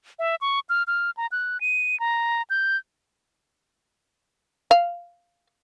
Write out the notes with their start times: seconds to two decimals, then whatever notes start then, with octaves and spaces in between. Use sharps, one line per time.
0.19 E5
0.41 C#6
0.69 F6
0.87 F6
1.17 A#5
1.32 F#6
1.61 D#7
2.00 A#5
2.50 G6
4.71 F5